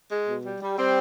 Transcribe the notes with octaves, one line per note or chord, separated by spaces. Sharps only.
G#3
B2
G3
G3
G3 C4